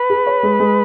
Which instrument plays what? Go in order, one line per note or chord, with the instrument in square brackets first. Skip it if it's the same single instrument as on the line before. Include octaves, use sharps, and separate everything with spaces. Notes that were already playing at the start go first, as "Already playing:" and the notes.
Already playing: [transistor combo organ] B4
[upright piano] G#4
C#5
G#3
G#3